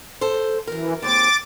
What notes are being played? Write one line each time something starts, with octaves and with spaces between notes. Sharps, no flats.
A4 C5
F#2 E3 A#4
D#2 G#2 C4 D6 A6